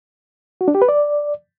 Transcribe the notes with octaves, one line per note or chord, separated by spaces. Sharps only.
F#4
D4
G4
B4
D5